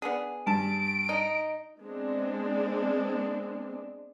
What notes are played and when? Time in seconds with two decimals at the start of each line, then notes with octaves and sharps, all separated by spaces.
0.02 B3 D4 G#4
0.46 G2 A5 D7
1.09 D#4
1.81 G#3 B3 C4 D4